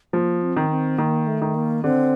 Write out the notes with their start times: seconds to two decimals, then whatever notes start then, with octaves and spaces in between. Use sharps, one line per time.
0.13 F3 A#3
0.42 C4
0.56 D#3
0.70 C4
0.98 D#3 A#3
1.27 A3
1.42 D#3
1.55 A#3
1.84 D3 C4